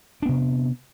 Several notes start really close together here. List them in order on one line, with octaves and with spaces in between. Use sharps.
D4 B3 C3